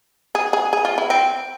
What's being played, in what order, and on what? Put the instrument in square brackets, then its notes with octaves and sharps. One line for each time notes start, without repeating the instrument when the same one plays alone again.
[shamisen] G#4
G#4
G#4
F4
E4
C4